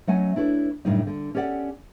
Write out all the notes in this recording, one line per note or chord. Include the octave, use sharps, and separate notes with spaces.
F#3 A3 C#4 D#5 F#5 G#5
D4 E4 A4 B4 C#5
F#2 A2 C#3 G3 D4 D#4
D3
C#4 G4 A4 D5 F5 F#5